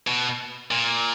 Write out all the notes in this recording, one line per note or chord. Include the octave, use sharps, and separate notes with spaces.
B2
A#2